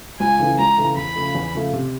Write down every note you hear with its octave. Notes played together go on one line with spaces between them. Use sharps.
C#2 G#5
C#3 E3 A3
C#2 A#5
C#3 E3 A3
E2 B5
C#3 F3 A3
E2
C#3 F3 A3
C3